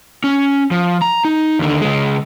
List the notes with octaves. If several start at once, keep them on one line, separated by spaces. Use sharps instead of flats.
C#4
F3
A#5
D#4
D#2 D3
C#2 G#3